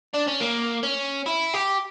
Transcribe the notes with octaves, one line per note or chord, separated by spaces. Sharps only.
D4
C#4
A#3
C#4
E4
G4